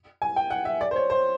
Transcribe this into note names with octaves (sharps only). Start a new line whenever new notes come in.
G#5
G5
F#5
E5
D5
C5
C#5
C5